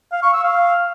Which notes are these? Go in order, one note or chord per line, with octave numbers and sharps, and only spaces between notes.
F5
C#6
E6
F5